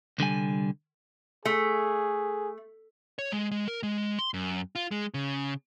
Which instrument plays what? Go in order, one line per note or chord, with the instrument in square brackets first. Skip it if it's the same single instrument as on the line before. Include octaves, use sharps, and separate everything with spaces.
[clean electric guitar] C2 D3 G3 G#5
[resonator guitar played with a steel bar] A3 [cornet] G#4
[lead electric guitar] C#5
G#3
G#3
A#4
G#3
C6
F#2
F4
G#3
C#3